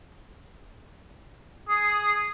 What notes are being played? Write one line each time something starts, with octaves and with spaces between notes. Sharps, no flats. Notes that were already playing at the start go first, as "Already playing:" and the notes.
G#4 D#6